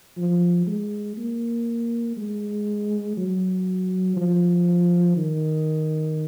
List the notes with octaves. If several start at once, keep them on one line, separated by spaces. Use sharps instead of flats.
F3
G#3
A#3
G#3
F#3
F3
D#3